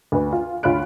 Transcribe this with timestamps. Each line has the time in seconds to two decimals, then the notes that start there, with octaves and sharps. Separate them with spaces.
0.12 D2 B4
0.32 F4
0.63 D2 F4 C#5 B5 F#6 D7